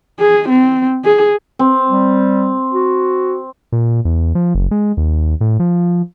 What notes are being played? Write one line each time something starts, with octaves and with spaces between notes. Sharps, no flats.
G#4
C4
G#4
C4
G3
F#4
A#2
E2
F3
F#1
G#3
D#2
A2
F3